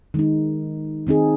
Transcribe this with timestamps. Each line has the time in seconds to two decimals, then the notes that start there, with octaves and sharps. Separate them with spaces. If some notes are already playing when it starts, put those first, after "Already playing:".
0.14 D#3 G#3 D#4
1.07 D#3 C4 D#4 G#4